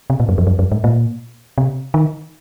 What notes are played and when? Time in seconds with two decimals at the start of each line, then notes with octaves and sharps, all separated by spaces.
0.10 C3
0.20 A#2
0.29 F#2
0.38 F2
0.47 F#2
0.59 F#2
0.72 G#2
0.84 A#2
1.58 C3
1.94 D#3